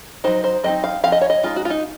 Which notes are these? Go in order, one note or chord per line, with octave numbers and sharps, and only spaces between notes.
F#3 C4 D#4 C5
C5
F#3 C4 D#4 D#5
F5
F3 C4 F5
D#5
C#5
D#5
G#3 D#4 F4
F#4
F4
D#4